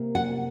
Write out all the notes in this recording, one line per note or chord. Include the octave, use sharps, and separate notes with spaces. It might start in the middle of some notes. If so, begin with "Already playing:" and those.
Already playing: C3 A#3
F#5